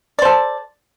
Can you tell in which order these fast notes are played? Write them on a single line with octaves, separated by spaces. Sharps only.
D5 C5 A4